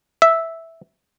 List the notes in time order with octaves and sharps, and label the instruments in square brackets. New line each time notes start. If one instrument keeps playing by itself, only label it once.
[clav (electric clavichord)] E5